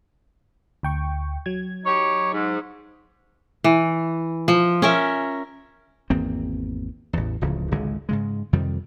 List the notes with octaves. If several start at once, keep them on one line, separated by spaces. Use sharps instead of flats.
D2 G5 C#6
F#3 G#6
D#4 G4 C#5
G#2
E3
F3
C#4 A#4 E5
G#1 E2 A#3 C4
A1 E2
D1 C#2 C#3 F3
G#1 C#2 D3 G#3
G#2 C#3 G#3
F2 C3 D#3 G3